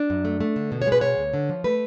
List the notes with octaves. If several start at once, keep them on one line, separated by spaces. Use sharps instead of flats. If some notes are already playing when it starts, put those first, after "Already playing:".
Already playing: D4
F#2
A3
A3
D3
B2
C#5
G#3
B4
B2 C#5
D2
D3
F3
A3 B4